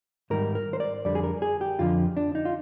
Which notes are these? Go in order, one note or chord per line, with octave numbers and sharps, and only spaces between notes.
G#2 D#3 G3 A#4
A#4
C5
D5
F2 D3 G3 D5
G#4
A#4
G#4
G4
F2 D3 F3 F4
D4
D#4
F4